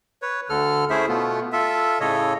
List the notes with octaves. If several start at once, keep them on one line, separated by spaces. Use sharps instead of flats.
B4 C#5
D2 D3 A4 F6
A3 C#4 E4 G#4 C5 E5
B2 A3 B3 F4
F4 A4 E5
A2 C#3 A4 C#5 D#5